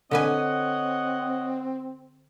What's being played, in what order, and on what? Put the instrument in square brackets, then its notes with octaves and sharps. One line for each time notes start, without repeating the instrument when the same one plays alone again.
[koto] D3 B4 G#5 [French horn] C4 [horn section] C#5 D#5 F#5